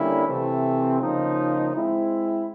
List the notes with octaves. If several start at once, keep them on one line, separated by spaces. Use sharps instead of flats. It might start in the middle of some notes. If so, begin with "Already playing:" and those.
Already playing: D3 G3 A#3 C#4 E4
C3 E3 A3 C4
C#3 F3 A#3 D#4
G#3 C4 E4